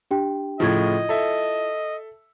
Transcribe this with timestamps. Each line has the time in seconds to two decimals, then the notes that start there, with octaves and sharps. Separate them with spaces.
0.11 D4 G4 G5
0.60 A2 C#3 F3 E4 F4 D#5 G#6
1.09 A4 E5